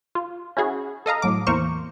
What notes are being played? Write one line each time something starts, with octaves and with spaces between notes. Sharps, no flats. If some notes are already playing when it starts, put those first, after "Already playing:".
F4
C#4 E4 F#4 G#4
A4 D#5 F5 A#5
A2 F#3 D6
E2 A#3 A#4 C5 C#6